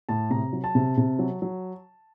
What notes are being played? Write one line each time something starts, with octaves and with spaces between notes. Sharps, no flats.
A2 A5
C3 A#5
F#3
A5
C3
C3
F#3
F#3